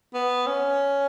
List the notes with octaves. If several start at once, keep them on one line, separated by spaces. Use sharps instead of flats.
B3
C#4